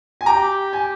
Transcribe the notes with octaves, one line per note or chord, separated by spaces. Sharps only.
G#5
G4 G5 A#5
G#5